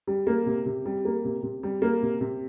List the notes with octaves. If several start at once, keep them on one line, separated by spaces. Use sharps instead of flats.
G3
A#3
C3
C3
G3
A#3
C3
C3
G3
A#3
C3
C3